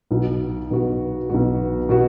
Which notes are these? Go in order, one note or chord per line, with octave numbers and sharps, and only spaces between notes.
B1 B2 B3 F#4
B1 B2 B3 F#4
B1 B2 B3 F#4
B2 B3 F#4